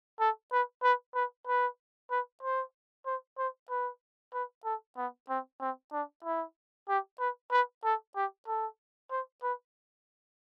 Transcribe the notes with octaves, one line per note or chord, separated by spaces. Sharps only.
A4
B4
B4
B4
B4
B4
C5
C5
C5
B4
B4
A4
B3
C4
C4
D4
E4
G4
B4
B4
A4
G4
A4
C5
B4